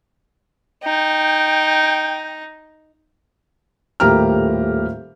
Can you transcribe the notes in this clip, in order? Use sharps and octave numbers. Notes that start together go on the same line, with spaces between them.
D#4 G5
D#1 A2 A#3 G4 A#5 F6